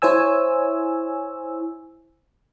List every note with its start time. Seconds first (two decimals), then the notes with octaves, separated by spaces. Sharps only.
0.02 E4 C5 C#5 G#5 E6